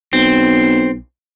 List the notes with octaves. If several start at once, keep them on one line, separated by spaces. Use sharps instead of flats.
B1 C4